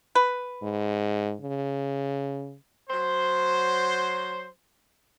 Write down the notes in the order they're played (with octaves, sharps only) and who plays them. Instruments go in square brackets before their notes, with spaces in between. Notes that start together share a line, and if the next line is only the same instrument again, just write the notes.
[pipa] B4
[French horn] G#2
C#3
[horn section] F#3 C5